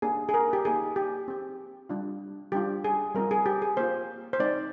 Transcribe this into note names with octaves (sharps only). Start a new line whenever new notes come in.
A#3 D4 G4 G#4
G#4
A#4
G4
A#3 D#4 G4 G#4
G4
C4 G4
G3 D4 F4
G3 D4 F4 G4
G#4
G3 C4 F4 A#4
G#4
G4
G#4
A#3 F4 C5
C5
G#3 C4 D#4 D5